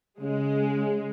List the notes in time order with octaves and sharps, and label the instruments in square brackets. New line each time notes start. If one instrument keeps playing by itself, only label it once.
[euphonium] C#3 [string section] G#3